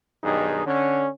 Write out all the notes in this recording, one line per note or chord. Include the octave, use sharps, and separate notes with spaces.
B1 G2 D#3 D#4 G#4
D3 C#4